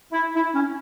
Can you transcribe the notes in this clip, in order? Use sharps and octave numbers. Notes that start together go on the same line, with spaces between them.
E4
E4
C#4